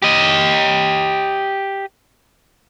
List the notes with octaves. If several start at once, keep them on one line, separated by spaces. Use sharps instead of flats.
G4 D#5